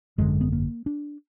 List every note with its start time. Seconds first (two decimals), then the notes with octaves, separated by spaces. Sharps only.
0.18 G#1 F#2 D3 G#3
0.41 B3
0.52 A#3
0.86 D4